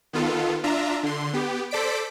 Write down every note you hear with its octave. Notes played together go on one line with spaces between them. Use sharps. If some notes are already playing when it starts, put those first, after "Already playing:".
D#3 B3 F4 A4
D4 F4 E5 A#5
D3 C6
B3 G4
A4 C5 D5 B6 D7